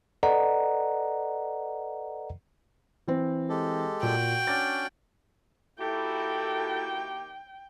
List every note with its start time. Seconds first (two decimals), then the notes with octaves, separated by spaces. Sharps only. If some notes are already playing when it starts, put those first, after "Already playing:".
0.23 A4 B4 D5 D#5 F#5 A#5
3.08 E3 C4
3.49 G#3 G4 A4
4.03 A#2 F#4 G5
4.47 C#4 D4 D5 A6
5.79 D#3 A#3 E4 F#4 G4 A4 G5